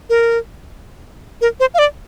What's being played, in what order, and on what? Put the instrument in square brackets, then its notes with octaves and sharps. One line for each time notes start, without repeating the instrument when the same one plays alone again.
[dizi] A#4
A#4
C5
F5
D5